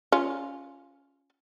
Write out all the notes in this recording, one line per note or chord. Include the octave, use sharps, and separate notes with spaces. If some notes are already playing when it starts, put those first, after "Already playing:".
C#4 F4